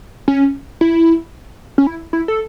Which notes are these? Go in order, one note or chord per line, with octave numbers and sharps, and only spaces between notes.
C#4
E4
C#4
E4
E4
A4